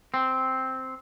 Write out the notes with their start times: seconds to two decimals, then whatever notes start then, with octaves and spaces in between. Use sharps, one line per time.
0.14 C4